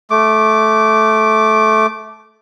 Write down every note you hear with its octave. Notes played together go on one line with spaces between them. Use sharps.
A3 D6